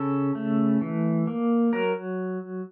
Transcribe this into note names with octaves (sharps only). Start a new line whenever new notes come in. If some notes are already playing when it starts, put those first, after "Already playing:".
Already playing: C#3 A4
A3
E3
A#3
F#3 A#4